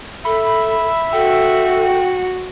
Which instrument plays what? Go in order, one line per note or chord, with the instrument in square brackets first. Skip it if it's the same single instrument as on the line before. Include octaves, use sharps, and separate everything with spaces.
[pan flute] A4 [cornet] E5 [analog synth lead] B5
[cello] F#4 [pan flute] A4 [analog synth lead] G5